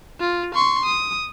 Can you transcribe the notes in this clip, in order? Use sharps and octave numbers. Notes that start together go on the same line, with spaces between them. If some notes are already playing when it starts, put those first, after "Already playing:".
F4
C6 C#6
D#6